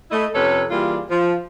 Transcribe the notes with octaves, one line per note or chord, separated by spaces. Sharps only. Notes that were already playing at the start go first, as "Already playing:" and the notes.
A3 E4 D#5
F2 C3 C#4 A4 B4 C#5
E3 G3 A#3 F4 G#4 D5
F3